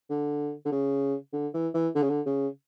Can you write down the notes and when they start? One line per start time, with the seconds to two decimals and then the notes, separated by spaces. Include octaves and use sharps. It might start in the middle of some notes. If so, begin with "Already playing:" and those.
0.10 D3
0.65 D3
0.72 C#3
1.33 D3
1.54 E3
1.74 E3
1.95 D3
2.02 C#3
2.10 D3
2.26 C#3